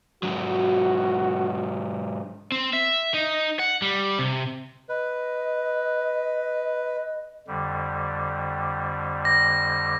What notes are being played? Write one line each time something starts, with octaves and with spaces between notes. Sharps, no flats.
G#2 F#3 F#4
C4
E5
D#4
F#5
G3
C3
B4 D#5
F2 D3 G3
A#6